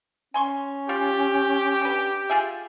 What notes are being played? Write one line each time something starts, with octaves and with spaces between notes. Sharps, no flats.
C#4 G#5 C6 C#6
F4 G4
D3 B4
F4 G#4 E5